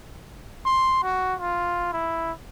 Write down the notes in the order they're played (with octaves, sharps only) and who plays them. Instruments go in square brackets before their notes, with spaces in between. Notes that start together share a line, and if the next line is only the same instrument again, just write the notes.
[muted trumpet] C6
F#4
F4
E4